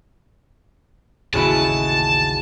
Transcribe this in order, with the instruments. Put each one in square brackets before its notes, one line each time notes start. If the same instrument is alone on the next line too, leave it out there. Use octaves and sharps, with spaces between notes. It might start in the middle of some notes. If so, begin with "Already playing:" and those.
[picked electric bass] A1 D#2 C#3 [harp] E4 F#4 G#4 [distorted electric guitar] A5